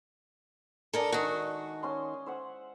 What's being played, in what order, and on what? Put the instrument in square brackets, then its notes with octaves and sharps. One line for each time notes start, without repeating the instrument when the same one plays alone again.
[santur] G#3 D4 G#5 [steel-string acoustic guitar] A4 A#4 D5
[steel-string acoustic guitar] D#3 F#4
[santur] C#4 C6
C5 E5 F#5